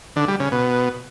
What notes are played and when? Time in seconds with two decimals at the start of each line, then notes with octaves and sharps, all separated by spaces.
0.16 D3
0.28 G3
0.40 C#3
0.52 B2